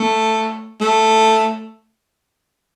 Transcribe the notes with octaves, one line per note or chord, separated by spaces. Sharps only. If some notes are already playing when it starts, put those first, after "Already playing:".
Already playing: A3
A3